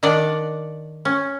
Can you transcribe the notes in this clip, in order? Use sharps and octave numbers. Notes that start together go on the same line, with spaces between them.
D#3 D4 D5 F#5
C#4